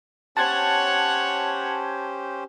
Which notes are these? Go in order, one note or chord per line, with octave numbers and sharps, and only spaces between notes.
C#4 G4 C5 C#5 F#5 A5 G#6